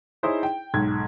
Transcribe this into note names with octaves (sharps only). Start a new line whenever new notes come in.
D#4 E4 G#4 C5 C#5
G5
B1 G#2 G#6